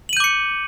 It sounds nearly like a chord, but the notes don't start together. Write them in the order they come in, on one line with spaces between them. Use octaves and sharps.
F#7 D#7 G6 D6 C#7